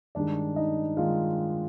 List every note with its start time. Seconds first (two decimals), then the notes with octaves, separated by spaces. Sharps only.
0.15 G2 D#3 G#3 D4 D5
0.56 D#4 D#5
0.97 D#3 G#3 F4 F5